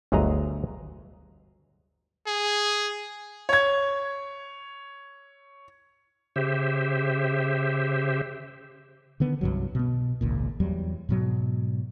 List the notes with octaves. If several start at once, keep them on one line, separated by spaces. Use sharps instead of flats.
G1 D2 F#3 G#4 D#5 A#5
G#4
C#5 G#6
C#3 G4 C5 E5
D3 D#3 B3
C2 G2 F#3
B2 B3
G#1 C#2 A#2
E2 F#3 G3
G#2 B2 F#3